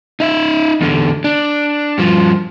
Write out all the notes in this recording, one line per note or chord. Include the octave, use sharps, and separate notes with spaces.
D#4 E5
E2 D3
D4
G2 F3